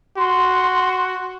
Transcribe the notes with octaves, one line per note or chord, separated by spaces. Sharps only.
F#4 C6